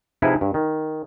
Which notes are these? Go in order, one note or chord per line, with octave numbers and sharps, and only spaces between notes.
C3 F3 D#4 E4 G#4 B4
G2
D#3